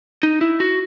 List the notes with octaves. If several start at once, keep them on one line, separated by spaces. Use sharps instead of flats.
D#4
E4
F#4